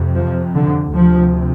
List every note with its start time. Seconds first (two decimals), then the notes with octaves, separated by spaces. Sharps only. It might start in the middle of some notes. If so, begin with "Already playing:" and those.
Already playing: F2 C3
0.15 F3
0.55 D3
0.95 D2 C3 F3